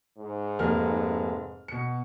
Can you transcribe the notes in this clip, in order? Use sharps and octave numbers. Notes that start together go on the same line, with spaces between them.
G#2
F1 A#3 F6
B2 C#7